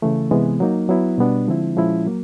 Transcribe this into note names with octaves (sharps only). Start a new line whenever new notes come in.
C#3 E3 A3
C3 E3 G#3 B3
F#3 A#3 D#4
F#3 B3 E4
B2 G3 B3 D4
D3 F3 G#3 C4 E4
A#2 F3 G#3 C#4 E4
F#3 A#3